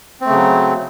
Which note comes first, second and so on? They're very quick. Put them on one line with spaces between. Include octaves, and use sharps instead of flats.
C4 A3 C#3 F#3